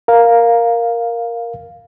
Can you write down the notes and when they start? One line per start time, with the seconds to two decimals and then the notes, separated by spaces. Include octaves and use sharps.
0.08 A#4 F5